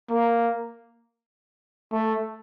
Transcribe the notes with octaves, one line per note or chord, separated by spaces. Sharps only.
A#3
A3